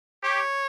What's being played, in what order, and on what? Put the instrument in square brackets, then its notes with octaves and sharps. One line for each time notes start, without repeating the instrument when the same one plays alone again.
[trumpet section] G4 [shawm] C#5